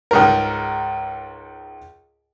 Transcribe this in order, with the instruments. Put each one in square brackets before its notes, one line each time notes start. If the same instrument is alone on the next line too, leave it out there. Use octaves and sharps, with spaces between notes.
[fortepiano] C#2 G#2 A#4